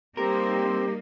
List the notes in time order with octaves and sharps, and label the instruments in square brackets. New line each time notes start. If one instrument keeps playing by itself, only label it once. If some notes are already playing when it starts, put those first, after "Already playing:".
[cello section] G3 A#3 D#4 [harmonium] C4 [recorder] G4 [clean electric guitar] A#4